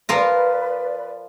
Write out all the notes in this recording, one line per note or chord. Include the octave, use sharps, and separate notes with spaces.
F3 F4 A#4 B4 D5